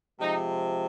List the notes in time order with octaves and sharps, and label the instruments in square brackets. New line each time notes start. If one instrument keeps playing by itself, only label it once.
[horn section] C3 F3 G#3 D#4